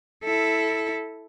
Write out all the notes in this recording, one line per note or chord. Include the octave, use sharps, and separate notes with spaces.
E4 A4